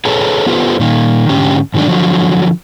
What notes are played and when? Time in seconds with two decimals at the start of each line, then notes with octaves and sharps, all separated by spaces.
0.05 G#4 A4 B4 C#5 A5 A#5
0.47 B3 F4 G4 A4 B4 C5
0.80 A#2 D#3
1.29 G#2 D3 C#4 G4
1.74 G#2 D#3 F#3 G#3 D4
1.88 D3 F3 F#3